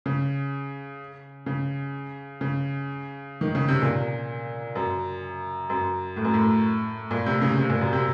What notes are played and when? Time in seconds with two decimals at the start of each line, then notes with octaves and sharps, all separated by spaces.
0.06 C#3
1.46 C#3
2.41 C#3
3.41 D#3
3.55 C#3
3.68 C3
3.82 A#2
4.75 F#2
5.70 F#2
6.16 A2
6.25 F#2
6.34 A2
7.11 A#2
7.26 C3
7.42 C#3
7.57 C3
7.70 A#2
7.81 F#2
7.93 C3